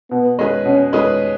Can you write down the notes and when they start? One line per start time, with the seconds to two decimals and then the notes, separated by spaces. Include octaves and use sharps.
0.11 B2 B3
0.39 G#3 C#4 G#4 B4
0.65 B2 C#4
0.93 G#3 C#4 G#4 B4